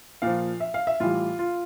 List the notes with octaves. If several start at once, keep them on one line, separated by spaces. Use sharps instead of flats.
A#2 F3 F5
E5
F5
E5
A2 E3 G3 F4
F4